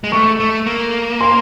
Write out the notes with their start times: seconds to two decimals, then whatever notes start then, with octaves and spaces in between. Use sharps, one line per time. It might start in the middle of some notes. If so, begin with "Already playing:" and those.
0.04 G#3
0.12 A3 C#6
0.40 A3
0.66 A#3
1.21 C6